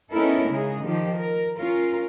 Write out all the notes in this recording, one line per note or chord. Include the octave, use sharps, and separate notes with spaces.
B3 C#4 D#4 E4 A4 A#4
C#3 G#3 D#4 G#4
D#3 F3 G4
A#4
C#4 F4 A#4